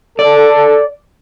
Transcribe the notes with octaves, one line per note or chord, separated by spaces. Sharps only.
A4 D5